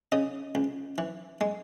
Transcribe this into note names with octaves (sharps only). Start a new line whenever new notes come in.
C#3 D#5
C#2
E3
G#3